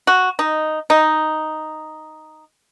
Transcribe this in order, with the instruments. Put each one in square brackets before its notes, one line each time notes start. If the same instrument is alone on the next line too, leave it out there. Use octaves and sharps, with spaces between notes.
[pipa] F#4
D#4
D#4